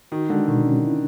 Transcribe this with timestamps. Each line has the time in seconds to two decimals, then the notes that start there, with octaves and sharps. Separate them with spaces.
0.12 D#3 F#4
0.29 D3 G#3
0.48 B2 D#3
0.65 C#4
0.84 E4